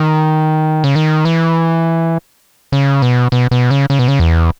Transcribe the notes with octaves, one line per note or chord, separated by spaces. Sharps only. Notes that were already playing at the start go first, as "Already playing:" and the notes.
Already playing: D#3
C#3
D#3
E3
C#3
B2
B2
B2
C#3
C#3
B2
C#3
E2